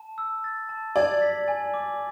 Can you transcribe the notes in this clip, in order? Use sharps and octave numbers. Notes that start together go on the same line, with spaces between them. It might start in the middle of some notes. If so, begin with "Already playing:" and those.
Already playing: A5
E6
A6
A5
D5 G#6
B6
G#5
D6